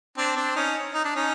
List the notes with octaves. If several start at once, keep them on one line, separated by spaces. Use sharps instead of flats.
C4 D4
C4 D4
C#4 D#4
D#4
D4
C#4 D#4